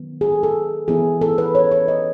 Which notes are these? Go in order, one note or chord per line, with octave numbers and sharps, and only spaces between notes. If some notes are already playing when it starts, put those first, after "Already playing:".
Already playing: D#3 F#3 B3
G#4
A4
A4
E3 B3 E4 G#4
A4
B4
C#5
C#5
D#5